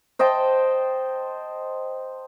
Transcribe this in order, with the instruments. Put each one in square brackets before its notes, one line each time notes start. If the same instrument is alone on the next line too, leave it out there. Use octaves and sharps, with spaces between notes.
[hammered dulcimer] C5 D#5 G5 A5